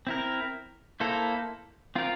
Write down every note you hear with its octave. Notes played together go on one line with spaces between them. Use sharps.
C4 E4 A#4
A#3 E4 A4 C5
C4 F4 A#4